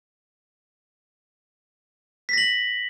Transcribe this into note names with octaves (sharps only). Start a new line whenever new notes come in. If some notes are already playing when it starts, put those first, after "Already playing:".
A#6 B6 F#7